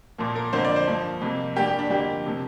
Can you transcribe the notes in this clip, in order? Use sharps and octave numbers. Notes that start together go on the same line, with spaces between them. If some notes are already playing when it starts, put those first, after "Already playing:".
A#2 F3 A#3
A#4
F2 D3 A#3 C5
D5
C5
G2 F3 A#3
F2 C3 A#3
G2 G3 A#3 G4
G4
D4
F2 D3 A#3 G4
C3 F3 A#3